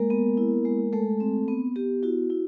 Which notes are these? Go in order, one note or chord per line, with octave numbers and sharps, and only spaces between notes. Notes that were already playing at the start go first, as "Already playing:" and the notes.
Already playing: G#3 A#3 A#4
B3
E4
G#3
G#3 A3 A4
C4
B3
B3 G4
E4 F#4
E4